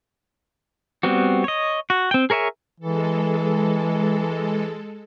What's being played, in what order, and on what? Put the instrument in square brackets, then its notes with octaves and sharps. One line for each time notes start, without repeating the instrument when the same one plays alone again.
[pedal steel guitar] G3 B3 C4 F#4
C#5 D#5
F#4
C4 G5
G#4 A#4 C#5 E5 G#5
[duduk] E3 [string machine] G#3 A4